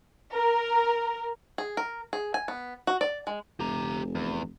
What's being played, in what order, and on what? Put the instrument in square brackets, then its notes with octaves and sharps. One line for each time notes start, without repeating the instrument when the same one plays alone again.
[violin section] A#4
[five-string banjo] G#4
A#4
G#4
G#5
B3
F#4
D5
G#3
[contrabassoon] F1 [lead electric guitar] G4 A#5
[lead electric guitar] E2